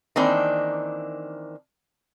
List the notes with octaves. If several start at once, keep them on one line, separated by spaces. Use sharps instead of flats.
D#3 E3 A#3 C4 D4